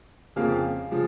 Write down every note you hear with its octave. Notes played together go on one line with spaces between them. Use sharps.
F2 C#3 F3 A#3 F5
C#3 F3